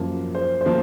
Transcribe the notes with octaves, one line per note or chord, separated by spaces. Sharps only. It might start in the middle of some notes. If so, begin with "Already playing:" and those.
Already playing: F#2 F3 A#3
C5
C5
F3 A#3 A#4